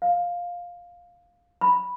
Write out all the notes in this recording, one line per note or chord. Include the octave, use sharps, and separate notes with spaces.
F5
B5